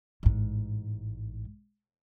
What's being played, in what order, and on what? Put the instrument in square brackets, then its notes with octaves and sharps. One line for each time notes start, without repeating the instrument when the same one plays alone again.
[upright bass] A1 G#2